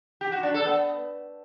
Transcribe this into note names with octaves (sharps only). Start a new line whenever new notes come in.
G4
F#4
D4
A4
B3